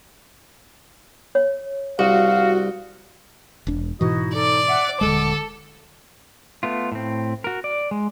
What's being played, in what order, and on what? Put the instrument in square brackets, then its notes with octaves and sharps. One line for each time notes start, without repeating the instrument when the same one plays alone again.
[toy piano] C#5
[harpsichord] C2 [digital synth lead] F#4 [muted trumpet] F5
[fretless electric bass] E1 D4
[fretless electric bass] G#2 B2 E3 [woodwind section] D#4 E4 F#4 [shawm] D#5
[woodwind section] D#4 A4 [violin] D5 [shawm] D6
[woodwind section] E5 F#5
[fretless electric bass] D#1 D#2 G#3 [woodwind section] D3 [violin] A4
[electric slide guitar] A3 B3 F4
A2 C4
F#4 A#4
D5
G#3